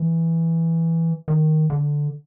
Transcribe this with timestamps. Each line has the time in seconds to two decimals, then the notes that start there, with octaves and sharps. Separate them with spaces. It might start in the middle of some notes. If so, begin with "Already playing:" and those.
Already playing: E3
1.28 D#3
1.70 D3